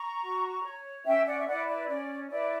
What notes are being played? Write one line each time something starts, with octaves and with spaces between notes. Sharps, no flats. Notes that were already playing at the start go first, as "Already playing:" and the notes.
Already playing: A#5 C#6
F#4
C#5
C#4 E5 G5
D5 F#5
E5
E4 B4 D5 F#5
D5
C#4 D5
E4 B4 D5